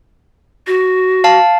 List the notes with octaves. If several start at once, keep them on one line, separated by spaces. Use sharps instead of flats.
F#4
F5 A5